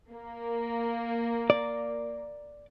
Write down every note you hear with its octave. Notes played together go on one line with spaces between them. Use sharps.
A#3
D5